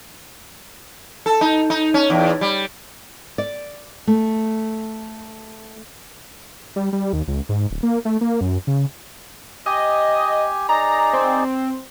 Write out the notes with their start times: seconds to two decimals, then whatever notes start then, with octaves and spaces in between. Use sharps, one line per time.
1.26 A4
1.41 D#4
1.70 D#4
1.94 C#4
2.10 E2
2.41 G3
3.38 D5
4.07 A3
6.76 G3
6.93 G3
7.13 D#2
7.28 C#2
7.49 G#2
7.71 D1
7.83 A#3
8.05 A3
8.21 A#3
8.41 F#2
8.67 C#3
9.66 G4 D#5 G#5
10.69 D#4 G#4 D5 A#5
11.13 C4